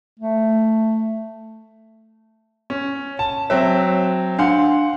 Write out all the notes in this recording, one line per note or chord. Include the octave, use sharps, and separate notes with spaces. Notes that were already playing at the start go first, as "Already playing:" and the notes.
A3
C#4
A5
F#3 C4 C#5 E5
D4 F5 F#5 C6